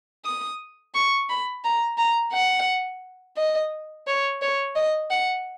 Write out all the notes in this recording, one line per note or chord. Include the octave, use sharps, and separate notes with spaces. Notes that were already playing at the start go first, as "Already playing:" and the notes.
D#6
C#6
B5
A#5
A#5
F#5
D#5
C#5
C#5
D#5
F#5